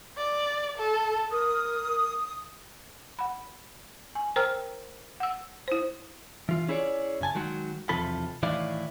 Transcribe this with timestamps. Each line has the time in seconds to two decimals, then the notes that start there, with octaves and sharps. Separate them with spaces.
0.17 D5
0.78 A4
1.31 A#4 D#6
3.19 F#5 B5
4.15 G#5
4.36 A#4 C5 G5 A#5 E6 F6
5.20 F#5 E6
5.68 E4 C5
6.49 E3 F4
6.68 C#4 E4 G#4 B4 C#5 D5
7.21 F#2 C#3 G#5 A5
7.35 D#3 F#3 G#3 F#4
7.89 B1 E2 C3 F3 A4 B5
8.43 A2 D#3 E3 E4 D5 F5